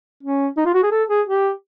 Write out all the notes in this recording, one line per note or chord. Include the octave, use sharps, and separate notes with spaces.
C#4
D#4
F4
F#4
G#4
A4
G#4
G4